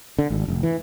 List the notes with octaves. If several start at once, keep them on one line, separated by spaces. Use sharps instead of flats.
D3
G#1
F1
E3